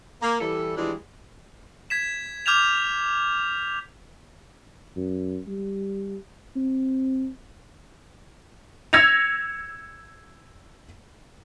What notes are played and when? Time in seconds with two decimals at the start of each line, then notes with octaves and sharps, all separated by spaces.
0.22 A#3
0.41 E3 G3 A4
0.77 E3 F3 G3 G#3 D4 E4
1.90 G#6 B6 E7
2.46 D6 F6 G6 G#6 E7 F7
4.97 F#2
5.47 G3
6.56 C4
8.93 E6 G#6 A#6 C#7 F7